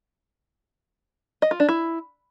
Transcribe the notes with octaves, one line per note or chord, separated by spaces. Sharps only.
D#5
F4
D4
E4